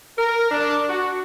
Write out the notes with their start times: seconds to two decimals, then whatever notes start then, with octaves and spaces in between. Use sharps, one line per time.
0.18 A#4
0.51 D4
0.89 F#4